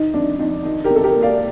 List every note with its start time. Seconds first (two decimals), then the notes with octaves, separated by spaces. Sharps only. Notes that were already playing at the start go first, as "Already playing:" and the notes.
Already playing: D#3 D#4
0.14 F2 D4
0.39 F2 D#4
0.65 D#3 D#4
0.84 G4 A#4
0.90 C3
0.96 A4
1.04 G4 A#4
1.16 A#3
1.23 D5 F5